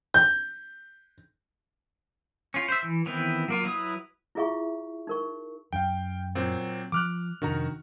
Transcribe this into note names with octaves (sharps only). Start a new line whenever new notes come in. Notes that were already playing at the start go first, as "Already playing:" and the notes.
G6
C#4 F4
C5 E5
E3
D#3 E3 B3 C4 E4
F#3 A#3 F4
F#3 E4 B4 D#6
E4 F4 G#4 E5 F5 C#6
D#4 A#4 C#6
F#2 F5 G5
A#2 F#3 C4
F3 D6 F6 F#6
F2 C3 D#3 D4 F#4 A#5